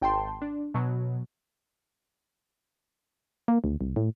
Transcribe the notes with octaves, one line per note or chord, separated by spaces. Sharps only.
G#1 G5 A5 C6
D4
B2 F#3
A#3
D2
C2
A2